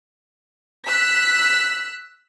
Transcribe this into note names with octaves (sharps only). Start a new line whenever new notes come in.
E6 F#6 B6